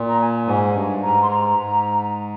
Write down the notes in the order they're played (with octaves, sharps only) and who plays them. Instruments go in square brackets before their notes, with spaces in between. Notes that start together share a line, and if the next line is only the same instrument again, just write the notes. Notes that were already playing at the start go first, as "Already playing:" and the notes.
Already playing: [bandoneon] A#2
[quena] A#5
G#5
[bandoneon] G#2
G2
[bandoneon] G#2 [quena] A#5
[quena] C6
A#5
[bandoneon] G#2